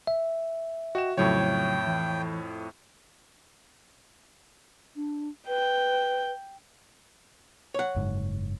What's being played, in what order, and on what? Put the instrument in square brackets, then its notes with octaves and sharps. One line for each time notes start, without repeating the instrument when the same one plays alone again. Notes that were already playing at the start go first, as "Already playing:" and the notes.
[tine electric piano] E5
[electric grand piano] F#4 E7 [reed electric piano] D#5 G5
[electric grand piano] F2 A2 C#5 [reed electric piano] C#3 F#3 [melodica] G5
[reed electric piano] E3
[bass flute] D4
[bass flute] B4 [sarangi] G5
[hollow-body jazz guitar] C#5 F#5
[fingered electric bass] F#1 G#2